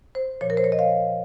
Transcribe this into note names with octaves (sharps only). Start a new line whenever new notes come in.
C5
A#2 F3 C#5
A#4
C5
C#5
D#5
F5